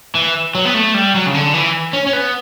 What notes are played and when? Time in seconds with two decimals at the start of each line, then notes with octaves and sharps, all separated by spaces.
0.15 E3
0.55 F#3
0.65 B3
0.74 A3
0.94 G3
1.14 F#3
1.26 C#3
1.34 D3
1.54 E3
1.93 C#4
2.07 C#4
2.13 B3